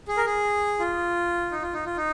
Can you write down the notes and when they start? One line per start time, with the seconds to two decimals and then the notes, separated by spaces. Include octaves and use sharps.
0.08 G#4
0.17 A#4
0.26 G#4
0.79 F4
1.52 D#4
1.62 F4
1.73 D#4
1.86 F4
1.97 D#4